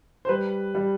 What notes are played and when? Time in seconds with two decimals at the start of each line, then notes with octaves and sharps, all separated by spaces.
0.25 C5
0.29 G3 B4
0.75 G3